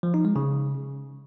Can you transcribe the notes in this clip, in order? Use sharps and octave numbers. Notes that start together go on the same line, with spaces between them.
F3
D#4
G#3
C#3